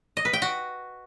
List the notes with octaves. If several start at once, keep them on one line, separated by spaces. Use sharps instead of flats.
D#5
B4
G5
F#4